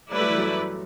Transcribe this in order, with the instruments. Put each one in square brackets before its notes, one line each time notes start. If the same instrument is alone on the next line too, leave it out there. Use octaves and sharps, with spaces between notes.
[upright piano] G3 [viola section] A3 E4 B4 D5
[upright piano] F#3
E3
F#2 F#3